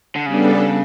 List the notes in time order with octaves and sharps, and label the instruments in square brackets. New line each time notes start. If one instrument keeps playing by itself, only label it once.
[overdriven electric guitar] D3
[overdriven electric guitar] C#3 [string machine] G3 B3 D4 A4